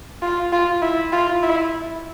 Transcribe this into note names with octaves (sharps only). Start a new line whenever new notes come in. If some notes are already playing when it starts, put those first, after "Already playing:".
F4
F4
E4
F4
E4